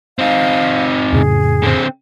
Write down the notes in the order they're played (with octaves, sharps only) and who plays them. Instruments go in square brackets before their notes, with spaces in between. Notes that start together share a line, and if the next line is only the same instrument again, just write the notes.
[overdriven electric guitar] C4 D#4 [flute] F5
[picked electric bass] F2 A2 C#3 [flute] G#4
[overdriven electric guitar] D3 C4